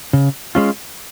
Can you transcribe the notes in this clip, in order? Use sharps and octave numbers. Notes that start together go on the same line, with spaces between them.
C#3
G#3 C#4 F4